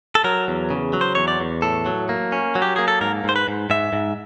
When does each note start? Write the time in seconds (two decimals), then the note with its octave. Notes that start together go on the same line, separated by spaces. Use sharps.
0.15 A4
0.24 F#3 A#4
0.48 E2
0.70 C#3
0.93 F#3
1.01 C5
1.15 E2 C#5
1.28 D5
1.40 E2
1.62 A2 A4
1.86 F#3
2.09 A#3
2.32 C#4
2.55 F#3
2.62 G4
2.76 A#3 G#4
2.88 A4
3.01 G#2 A#4
3.24 G#2 C5
3.36 B4
3.48 G#2
3.70 G#2 E5
3.93 G#2